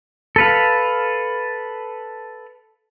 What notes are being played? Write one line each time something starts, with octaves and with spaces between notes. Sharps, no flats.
A4 B4 F5